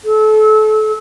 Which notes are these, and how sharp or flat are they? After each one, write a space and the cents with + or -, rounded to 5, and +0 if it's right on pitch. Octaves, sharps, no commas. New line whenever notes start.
A4 -30